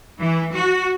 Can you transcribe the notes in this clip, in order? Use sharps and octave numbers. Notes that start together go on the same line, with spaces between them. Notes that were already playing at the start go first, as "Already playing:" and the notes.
E3
F#4